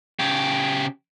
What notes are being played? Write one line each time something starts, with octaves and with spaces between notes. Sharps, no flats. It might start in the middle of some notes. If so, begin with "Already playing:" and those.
C#3 G4